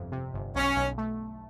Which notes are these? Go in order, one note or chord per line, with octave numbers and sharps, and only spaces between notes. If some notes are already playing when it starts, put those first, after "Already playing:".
Already playing: G1 F2 C3
C3
G1
B1 C#4
B1
A3